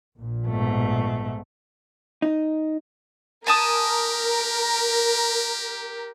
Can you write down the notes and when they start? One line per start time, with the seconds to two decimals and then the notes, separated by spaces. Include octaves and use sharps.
0.16 A#1 A#2
0.47 G#2 B2 A3
2.22 D#4
3.47 G4 A#4 G#5 A5 D#6